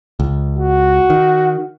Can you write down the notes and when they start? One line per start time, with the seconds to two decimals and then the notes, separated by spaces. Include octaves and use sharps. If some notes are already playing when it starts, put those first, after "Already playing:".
0.20 C#2
0.58 F#4
1.10 D#3